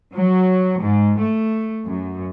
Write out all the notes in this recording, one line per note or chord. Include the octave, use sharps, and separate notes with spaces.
F#3
G#2
A3
F#2